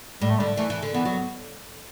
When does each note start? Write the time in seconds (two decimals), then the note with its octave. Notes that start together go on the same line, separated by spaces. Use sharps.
0.21 A2 G3
0.30 A3
0.39 D3 G3
0.57 E3 A3
0.70 E3
0.82 D3
0.94 E3 B3
1.05 F#3